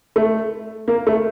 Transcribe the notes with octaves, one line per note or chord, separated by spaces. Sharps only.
A3
A#3
A3